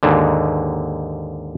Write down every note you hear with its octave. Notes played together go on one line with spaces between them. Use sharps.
D#2 G#2 D3